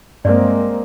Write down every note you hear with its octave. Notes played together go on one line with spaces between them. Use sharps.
G2 G#3 A#3 C4 D5